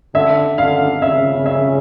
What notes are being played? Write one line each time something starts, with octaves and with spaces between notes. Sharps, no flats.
D3 E5
D3 F5
C#3 E5
E5